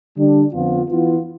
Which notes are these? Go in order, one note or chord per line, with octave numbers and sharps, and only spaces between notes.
D3 G3 D4
F2 D3 F3 B3 F4
E3 B3 F4